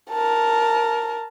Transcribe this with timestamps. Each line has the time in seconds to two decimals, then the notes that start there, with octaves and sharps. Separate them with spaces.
0.11 A#4 A5